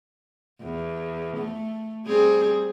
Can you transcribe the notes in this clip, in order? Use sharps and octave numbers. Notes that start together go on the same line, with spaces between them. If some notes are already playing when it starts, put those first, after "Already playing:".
E2
A3
G3 C4 G#4